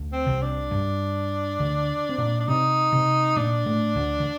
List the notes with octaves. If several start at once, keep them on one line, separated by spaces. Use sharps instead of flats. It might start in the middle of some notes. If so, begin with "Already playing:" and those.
Already playing: D2 D3
C4
C2 C3
D4
G2
D2 D3
C4
A#2 A#3
D4
C3 C4 D#4
C3 C4
A#2 A#3 D4
A2 A3
D2 D3
D3